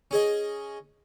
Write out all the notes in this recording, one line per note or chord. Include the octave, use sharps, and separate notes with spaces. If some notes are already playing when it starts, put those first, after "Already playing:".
C#4 G#4 D#5